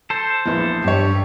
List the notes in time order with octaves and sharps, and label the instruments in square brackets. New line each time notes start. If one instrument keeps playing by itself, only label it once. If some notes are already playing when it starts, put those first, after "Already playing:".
[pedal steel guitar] A4 C5
[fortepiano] A#1 E2
[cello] G2 [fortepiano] G4 C#5